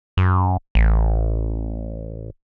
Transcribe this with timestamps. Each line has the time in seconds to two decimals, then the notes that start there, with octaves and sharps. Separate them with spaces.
0.17 F#2
0.75 A1